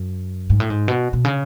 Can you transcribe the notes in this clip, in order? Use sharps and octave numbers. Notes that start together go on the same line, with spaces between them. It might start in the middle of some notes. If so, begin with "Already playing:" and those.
Already playing: F#2
G#2
A2
G#2
B2
B2
C#3